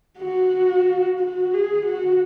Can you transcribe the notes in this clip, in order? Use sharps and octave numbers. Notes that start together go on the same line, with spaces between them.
F#4
F#4
G#4
F#4